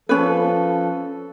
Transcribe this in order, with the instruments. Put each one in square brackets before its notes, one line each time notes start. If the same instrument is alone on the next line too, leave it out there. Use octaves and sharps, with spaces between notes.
[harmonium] F3 A4 [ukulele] C#4 B4